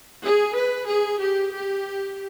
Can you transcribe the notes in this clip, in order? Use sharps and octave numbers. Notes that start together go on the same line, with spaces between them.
G#4
B4
G#4
G4
G4